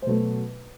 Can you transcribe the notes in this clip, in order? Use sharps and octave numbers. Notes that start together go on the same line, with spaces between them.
C5
B2 F#3 A3 B4